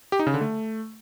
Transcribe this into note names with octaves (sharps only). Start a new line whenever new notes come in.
G4
D#4
C#3
D3
A3